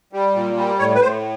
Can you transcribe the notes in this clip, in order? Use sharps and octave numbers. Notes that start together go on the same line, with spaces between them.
G3
A#2
G3
A2 C#5
B4
A2 C5